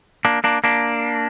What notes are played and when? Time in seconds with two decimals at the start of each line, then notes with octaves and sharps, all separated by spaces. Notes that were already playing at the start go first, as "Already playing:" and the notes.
0.25 A#3 D4
0.44 A#3 D4
0.64 A#3 D4